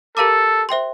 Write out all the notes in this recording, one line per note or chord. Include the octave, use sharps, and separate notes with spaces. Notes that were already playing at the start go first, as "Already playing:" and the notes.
G4 A4 A#4 F5 A#5 D6
C5 E5 G5 C6